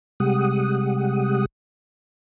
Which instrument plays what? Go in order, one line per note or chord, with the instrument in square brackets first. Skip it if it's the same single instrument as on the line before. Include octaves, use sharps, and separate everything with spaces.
[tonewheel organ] C3 G3 G#3 G4 F#5 D#6